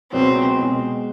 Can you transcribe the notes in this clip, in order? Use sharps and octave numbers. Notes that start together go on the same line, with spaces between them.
C#2 B2 F#3 B3 C4
B2 G#3